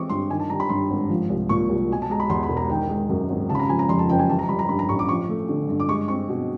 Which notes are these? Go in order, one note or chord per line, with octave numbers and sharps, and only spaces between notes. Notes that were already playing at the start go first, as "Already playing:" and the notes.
Already playing: E3 G#3 C4 C#6 D6
G2 C6
D#3 G#5
A5
G3 A#5
B5
G2 C6
G#1
F3
C2
A#2 C#6
C2
B2 G#5
A5
G#3 A#5
B5
E2 C6
B5
E1
A#5
D#3 G5
G#3
F#2
G#1
C#3 A5
B5
A#5
F3 G#5
A#5
F2 C6
A5
F#1 G5
G#5
E3 A5
A#5
G3 B5
A#5
G2 B5
A#5
A1 C#6
D6
F3 C#6
A3
D3
G2
D6
G#3 C#6
C4 C#6
B2